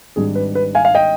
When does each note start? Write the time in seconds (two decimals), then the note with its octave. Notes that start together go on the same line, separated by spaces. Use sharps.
0.16 G#1 G#2 G3 D4 G#4
0.35 B4
0.55 B4
0.75 F5 G#5
0.85 F5
0.95 D#5 G5